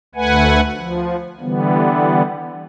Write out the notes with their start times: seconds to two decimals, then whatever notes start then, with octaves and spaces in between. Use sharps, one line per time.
0.15 D2 A3 B4 F#5 G#5
0.77 F3
1.41 D3 E3 G3 B3